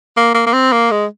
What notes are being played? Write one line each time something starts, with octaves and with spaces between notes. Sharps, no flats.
A#3
A#3
A#3
C4
A#3
G#3